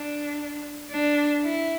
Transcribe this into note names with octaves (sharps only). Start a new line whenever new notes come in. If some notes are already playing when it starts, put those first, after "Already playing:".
Already playing: D4
D4
E4